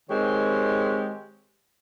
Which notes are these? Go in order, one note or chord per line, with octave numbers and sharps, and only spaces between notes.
D#3 G#3 C4 G4 C#5